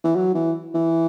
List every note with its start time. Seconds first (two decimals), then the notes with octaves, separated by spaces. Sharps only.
0.04 E3
0.16 F#3
0.35 E3
0.75 E3